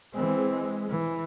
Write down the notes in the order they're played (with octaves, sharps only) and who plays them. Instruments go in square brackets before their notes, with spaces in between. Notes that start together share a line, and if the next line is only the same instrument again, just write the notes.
[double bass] E3 C4 [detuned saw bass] G#3
[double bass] E3